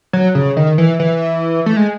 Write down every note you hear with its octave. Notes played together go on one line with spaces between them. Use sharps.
F#3
C#3
D#3
E3
E3
A3
G#3